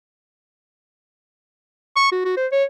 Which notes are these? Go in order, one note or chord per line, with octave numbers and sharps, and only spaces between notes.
C#6
F#4
F#4
C5
C#5